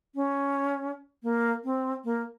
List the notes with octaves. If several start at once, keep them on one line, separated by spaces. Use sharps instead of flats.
C#4
A#3
C4
A#3